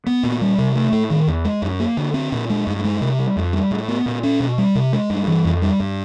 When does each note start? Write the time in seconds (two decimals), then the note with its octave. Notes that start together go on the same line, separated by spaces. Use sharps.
0.06 B3
0.23 A#2
0.41 G3
0.58 C3
0.75 A3
0.92 A2
1.10 D#3
1.27 E2
1.44 G#3
1.62 F#2
1.80 A#3
1.97 D3
2.14 C4
2.32 A#2
2.50 G#3
2.67 G2
2.84 G#3
3.01 C3
3.19 G3
3.36 F2
3.53 G3
3.71 A2
3.88 B3
4.06 A#2
4.23 C#4
4.40 B2
4.58 G3
4.75 C3
4.93 G#3
5.10 G2
5.27 E3
5.44 F2
5.62 G3
5.80 G2